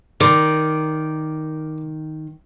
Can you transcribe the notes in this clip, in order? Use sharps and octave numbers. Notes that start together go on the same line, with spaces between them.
D#3 A#4 D5 C6